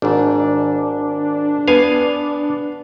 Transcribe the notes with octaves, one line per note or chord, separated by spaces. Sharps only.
G#1 G#2 D4
B3 F5 G#5